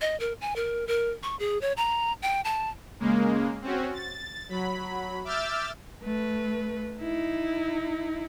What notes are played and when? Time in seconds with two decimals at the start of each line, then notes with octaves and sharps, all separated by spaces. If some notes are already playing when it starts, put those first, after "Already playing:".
0.01 D#5
0.20 A#4
0.41 G#5
0.56 A#4
0.87 A#4
1.23 C#6
1.40 G#4
1.61 C#5
1.77 A#5
2.23 G5
2.45 A5
3.00 C#3 G#3 A#3
3.62 C4 C#4 F#4
3.94 A6
4.49 F#3 B5
5.25 E5 D6 E6 F6 G6 A6
6.03 A3 B4
7.00 D#4 E4